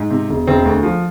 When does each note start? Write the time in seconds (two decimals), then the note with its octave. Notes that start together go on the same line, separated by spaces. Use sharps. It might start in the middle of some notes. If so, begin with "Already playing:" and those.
Already playing: G#2
0.10 C3
0.30 E1
0.47 E1 C4
0.65 D2
0.83 F3